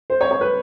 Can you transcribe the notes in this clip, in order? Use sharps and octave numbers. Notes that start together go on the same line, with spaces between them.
C5
C#5
C#5
B4